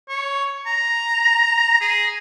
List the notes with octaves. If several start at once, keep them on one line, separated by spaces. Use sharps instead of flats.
C#5
A#5
G#4